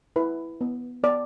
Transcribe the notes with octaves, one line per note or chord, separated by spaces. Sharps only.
E4 B4
B3
B3 D5